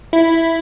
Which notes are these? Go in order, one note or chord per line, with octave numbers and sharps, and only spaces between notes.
E4